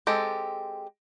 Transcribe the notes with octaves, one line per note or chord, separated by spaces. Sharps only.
G#3 C4 G4 A4